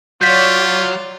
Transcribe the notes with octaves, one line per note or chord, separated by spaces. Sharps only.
F#3 F4 C#5 D5 G6 B6